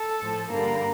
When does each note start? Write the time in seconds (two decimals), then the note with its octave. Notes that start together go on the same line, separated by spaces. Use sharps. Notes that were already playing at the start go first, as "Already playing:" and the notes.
Already playing: A4
0.20 A2 F3
0.51 G2 D3 G3 A#3